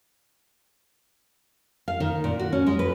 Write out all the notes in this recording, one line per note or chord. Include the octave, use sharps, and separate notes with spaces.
F5
D#3
A#2
F#4
C#4
G#3
B4